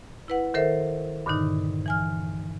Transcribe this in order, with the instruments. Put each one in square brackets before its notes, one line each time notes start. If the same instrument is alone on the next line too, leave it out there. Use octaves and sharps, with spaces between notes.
[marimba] E4 B4 F#5
D#3 A4 A#4 C5 E5
G2 A#2 D3 D#3 D#4
E3 G#5 F6